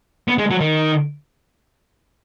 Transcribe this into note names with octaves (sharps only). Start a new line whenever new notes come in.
B3
G#3
F#3
D#3